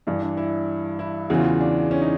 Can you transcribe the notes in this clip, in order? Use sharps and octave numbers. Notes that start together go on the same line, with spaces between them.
G2 E3 D4
D4
E4
E4
E2 C#3 E3 F#4
F4
D4
C#4
D#4